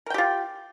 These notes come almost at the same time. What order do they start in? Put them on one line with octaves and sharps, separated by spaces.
A#4 G5 G4 F4